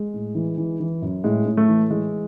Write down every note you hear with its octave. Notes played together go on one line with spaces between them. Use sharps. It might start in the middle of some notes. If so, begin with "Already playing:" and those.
Already playing: G#3
A2
E3
E3
E3
F#2
A2 G#3
A2
A3
E3
E3 G#3